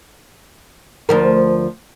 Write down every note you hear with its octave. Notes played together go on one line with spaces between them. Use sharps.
D2 F3 A#4